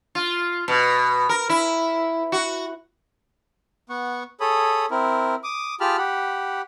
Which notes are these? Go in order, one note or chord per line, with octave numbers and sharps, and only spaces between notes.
F4
B2
A#4
E4
F#4
B3 F#5 C#6
G#4 A4 C#5 B5 D#6
C4 E4 A#4
D6 D#6
F4 G4 G#4 A5 B5 F6
G4 F#5 B5